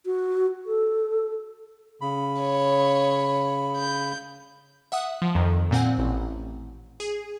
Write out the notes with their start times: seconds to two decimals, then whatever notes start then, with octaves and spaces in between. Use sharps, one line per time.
0.06 F#4
0.66 A4
2.01 C#3 B5
2.40 C#5
3.77 G6
4.92 E5 F#5 D#6
5.22 F3
5.35 F2 D#3
5.71 A#2 C4 F#5 G#5
5.98 A1
7.00 G#4